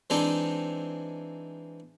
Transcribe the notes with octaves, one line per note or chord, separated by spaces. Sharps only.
E3 G#3 C4 D4 D#4